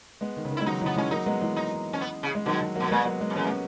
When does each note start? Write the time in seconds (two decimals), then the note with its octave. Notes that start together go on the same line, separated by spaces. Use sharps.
0.21 G#3 B3
0.36 D#3
0.45 C#3
0.52 D#3
0.57 G#3 E4
0.66 D#3 F#3 D#4
0.81 C#3 E3 B3
0.96 E3 G#3 C#4
1.11 F#3 A#3 D#4
1.26 G#3 B3
1.41 E3 G#3
1.56 D#4
1.93 C#4
2.01 B3
2.23 C#3
2.35 G#3
2.46 B2 D#3 F#3
2.61 D#3
2.75 F#3 A#3
2.80 B2
2.86 A#3
2.91 A#2 G#3 B3
3.05 F#3 A#3
3.21 G#3 B3
3.30 F#2
3.35 E2 A#3 C#4
3.46 G#3 B3